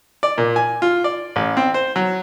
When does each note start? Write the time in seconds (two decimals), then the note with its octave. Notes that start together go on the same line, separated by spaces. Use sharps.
0.23 D5
0.38 A#2
0.56 G#5
0.82 F4
1.04 D5
1.36 A1
1.57 C4
1.74 C5
1.96 F#3